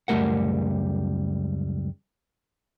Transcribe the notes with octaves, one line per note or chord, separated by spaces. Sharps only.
C#2 F#2 G3 A3 A#4 F#5